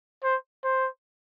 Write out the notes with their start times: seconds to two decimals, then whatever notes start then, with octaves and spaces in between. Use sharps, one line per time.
0.23 C5
0.64 C5